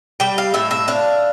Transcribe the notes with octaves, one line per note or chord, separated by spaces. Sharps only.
G3 G5
F5
A2 E5
E5
D4 F5